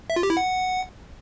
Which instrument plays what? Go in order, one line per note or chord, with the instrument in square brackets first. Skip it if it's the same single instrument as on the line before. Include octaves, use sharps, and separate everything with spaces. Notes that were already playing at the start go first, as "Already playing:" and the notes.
[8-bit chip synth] E5
F4
G4
E4
F#5